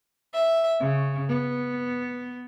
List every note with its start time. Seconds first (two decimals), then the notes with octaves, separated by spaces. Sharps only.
0.33 E5
0.81 C#3
1.29 B3